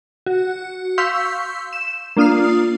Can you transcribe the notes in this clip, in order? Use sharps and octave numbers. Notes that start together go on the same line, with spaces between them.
F#4
F5 C6 C#6 E6 G6 B6
E7
A#3 D4 F4 D#6 F6 C7